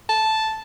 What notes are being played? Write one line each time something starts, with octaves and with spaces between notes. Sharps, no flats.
A5